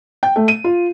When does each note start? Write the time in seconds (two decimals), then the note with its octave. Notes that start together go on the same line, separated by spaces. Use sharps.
0.23 G5
0.36 A3
0.48 D#7
0.64 F4